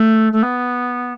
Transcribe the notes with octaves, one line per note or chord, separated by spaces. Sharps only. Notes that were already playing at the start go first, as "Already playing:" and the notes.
Already playing: A3
A3
B3